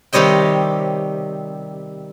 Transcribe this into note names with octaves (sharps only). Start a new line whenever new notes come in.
C3 D#3 G3 C#5 D#5 G5